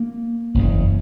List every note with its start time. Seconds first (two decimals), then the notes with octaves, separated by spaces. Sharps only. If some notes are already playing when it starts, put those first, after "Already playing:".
Already playing: A#3
0.54 F#1 E2 C#3